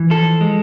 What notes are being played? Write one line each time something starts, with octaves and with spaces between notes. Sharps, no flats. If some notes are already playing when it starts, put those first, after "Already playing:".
Already playing: E3
F3 A4
G#3